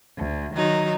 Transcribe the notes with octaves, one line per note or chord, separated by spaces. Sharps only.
D2
D#3 F#3 D#4